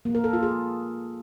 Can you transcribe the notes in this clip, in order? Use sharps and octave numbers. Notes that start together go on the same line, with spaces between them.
A#3
A#4
A4
F4
G#4